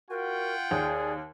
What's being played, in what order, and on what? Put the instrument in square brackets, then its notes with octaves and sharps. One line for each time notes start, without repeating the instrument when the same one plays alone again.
[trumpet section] F4 F#5 G5 [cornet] F#4 [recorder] A#4
[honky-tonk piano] D#2 [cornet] G#4 [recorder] D5